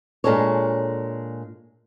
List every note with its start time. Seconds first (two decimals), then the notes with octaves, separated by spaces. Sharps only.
0.24 A#2 G#3 D4 A4 C#5